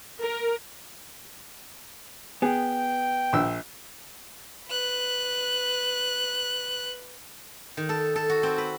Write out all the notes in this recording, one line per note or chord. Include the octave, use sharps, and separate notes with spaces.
A#4
B3 G#4 G5
A#1 E6
B4 F#6
D#3
A4
A4
F#4
C4
B4